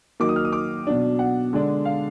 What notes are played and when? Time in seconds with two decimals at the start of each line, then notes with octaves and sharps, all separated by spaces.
0.20 D#3 F#3 A#3 D#4 D6
0.29 D#6
0.36 F6
0.45 D#6
0.52 D6
0.87 B2 F#3 D4
1.19 F#5
1.53 D3 G#3 D4
1.85 F5